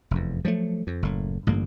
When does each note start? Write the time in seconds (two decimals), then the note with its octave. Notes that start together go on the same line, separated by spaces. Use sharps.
0.11 F1 E2
0.45 F3 F#3 G#3 A3
0.87 F2
1.02 F#1 A2
1.47 A1 G2 D3 A#3